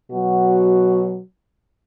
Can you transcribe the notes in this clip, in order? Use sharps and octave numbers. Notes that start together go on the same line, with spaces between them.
B2 F#3 F#4